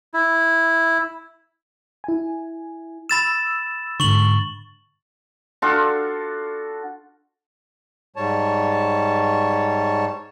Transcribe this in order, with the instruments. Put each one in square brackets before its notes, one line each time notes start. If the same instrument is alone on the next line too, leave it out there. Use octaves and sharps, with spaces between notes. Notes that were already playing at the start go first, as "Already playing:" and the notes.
[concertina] E4
[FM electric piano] E4 G#5
[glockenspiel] B5 A6 E7 [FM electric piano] E6
[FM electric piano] G#2 D3 [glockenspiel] C#6 F#7
[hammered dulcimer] D4 F4 F#4 A4
[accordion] G#2 G3 C#5 A5